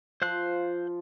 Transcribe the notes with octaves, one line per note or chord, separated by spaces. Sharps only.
F3 C5 F5 F#6